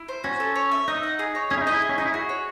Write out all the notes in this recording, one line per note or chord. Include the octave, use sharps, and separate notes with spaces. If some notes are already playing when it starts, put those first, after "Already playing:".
Already playing: E4
C5
C#4 F#4
A4
C#5
E5
D#4 D#5
F#5
G#4
C#5
C#4 G#4
E4
D#4
D#5
E4
G#4
C#4
D#4 D#5
E4
F#4 G#4
C#5